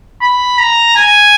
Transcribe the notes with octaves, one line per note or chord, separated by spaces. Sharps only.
B5
A#5
G#5